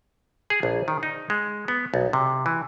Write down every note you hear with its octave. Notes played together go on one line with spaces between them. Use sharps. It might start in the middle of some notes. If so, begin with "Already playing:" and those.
G#4
A#1
D#3
D#4
G#3
B3
B1
C3
E3